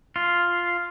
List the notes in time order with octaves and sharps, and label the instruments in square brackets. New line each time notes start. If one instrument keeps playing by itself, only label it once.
[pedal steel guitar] F4